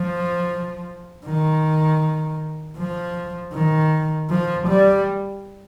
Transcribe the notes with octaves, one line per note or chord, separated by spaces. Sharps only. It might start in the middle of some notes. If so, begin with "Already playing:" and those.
Already playing: F3
D#3
F3
D#3
F3
G3